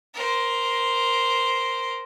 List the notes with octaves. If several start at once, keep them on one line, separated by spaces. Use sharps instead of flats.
A#4 C5